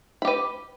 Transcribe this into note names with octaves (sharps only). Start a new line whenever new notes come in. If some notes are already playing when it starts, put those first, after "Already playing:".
G4 B4 B5